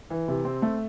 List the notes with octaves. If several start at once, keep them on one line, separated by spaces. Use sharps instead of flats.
E3
C3
C4
A3